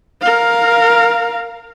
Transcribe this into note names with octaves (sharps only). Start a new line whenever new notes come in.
A#4 F5